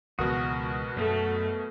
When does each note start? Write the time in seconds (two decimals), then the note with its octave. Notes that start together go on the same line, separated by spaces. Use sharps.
0.19 C#2 B2 E3 G#3 F#4 A#4 D#6
0.96 F#2 A3